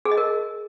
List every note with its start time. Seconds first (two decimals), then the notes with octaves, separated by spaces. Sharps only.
0.05 G#4
0.11 D#5
0.17 A#4